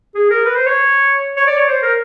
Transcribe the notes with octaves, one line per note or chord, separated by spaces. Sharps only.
G#4
A#4
B4
C5
C#5
C#5
D5
C#5
C5
A#4